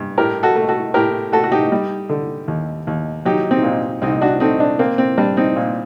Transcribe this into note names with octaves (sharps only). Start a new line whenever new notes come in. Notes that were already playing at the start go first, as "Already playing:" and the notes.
Already playing: G2
A2 G4 A#4
F#4 A4
A3
F#4 A4
A2 G4 A#4
A3 F#4 A4
F#4
D#4 G4
G3
D3
D#2
D#2
F#3 D#4 G4
C4 D#4
A#2
C2 C4 D#4
D4 F#4
A3 C4 D#4
D4
A#3 C4
C4
G3 D4
C4 D#4
A#2